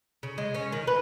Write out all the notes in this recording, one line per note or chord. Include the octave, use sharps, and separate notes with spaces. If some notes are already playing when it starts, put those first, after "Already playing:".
C#3
G#3
C#4
D#3
B4